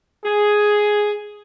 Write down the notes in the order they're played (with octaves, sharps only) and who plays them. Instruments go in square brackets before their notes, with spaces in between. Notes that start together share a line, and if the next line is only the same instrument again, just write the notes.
[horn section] G#4